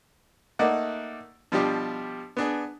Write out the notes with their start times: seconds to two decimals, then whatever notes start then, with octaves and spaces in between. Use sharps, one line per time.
0.59 A3 A#3 D#4 D5 F#5
1.52 B2 F3 G3 D4 G4
2.37 B3 D4 G#4